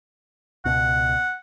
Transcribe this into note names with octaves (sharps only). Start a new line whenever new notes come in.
C#2 B2 F#5